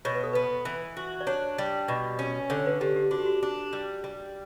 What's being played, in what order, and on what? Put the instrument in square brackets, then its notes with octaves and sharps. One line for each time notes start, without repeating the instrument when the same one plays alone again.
[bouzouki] B2 [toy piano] C#5
[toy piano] B4
A4
[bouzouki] B3 [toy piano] B4
[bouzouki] E3
F#4
[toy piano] D5
[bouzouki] D4 [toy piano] C#5
[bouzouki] G3
B2
C#4
[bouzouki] D3 [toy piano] C#5
[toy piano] B4
[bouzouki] D3 [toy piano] G4
[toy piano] G4
[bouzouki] D4 [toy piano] F#4
[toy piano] G4
F#4
[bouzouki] D4
G3
G3